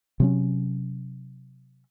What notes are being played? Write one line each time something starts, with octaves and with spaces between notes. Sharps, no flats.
C3 F#3 C#4